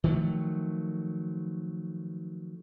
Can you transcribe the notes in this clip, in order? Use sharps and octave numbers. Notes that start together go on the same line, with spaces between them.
D#3 F3 F#3 A3